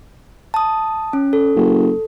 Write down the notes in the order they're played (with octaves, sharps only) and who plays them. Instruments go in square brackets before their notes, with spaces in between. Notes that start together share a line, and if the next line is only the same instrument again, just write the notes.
[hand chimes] A5 D#6
C#4
A4
[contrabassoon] F#1